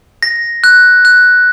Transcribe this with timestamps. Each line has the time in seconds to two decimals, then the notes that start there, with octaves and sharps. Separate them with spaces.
0.23 A#6
0.64 F#6
1.05 F#6